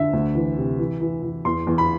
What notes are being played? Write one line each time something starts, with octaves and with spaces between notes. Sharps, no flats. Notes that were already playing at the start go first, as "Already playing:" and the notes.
Already playing: D3 E5
D2
E3
C3
E3
E3
E3
E2 C6
E2
B5